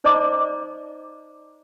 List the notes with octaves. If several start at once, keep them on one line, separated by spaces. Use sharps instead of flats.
D#4 C5 D5 D#5 A#5 D6